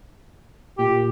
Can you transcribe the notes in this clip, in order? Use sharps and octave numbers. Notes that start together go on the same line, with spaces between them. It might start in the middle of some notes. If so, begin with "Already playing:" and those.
A#2 G4